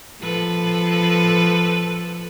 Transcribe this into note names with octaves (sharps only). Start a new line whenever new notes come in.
F3 A4 B4